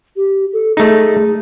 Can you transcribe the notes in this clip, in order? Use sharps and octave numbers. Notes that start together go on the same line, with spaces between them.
G4
A4
A3 D#4 G#4